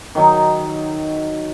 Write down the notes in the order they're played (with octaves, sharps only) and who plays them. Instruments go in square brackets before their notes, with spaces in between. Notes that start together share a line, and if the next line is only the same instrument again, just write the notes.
[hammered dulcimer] D#3 F#3 D#4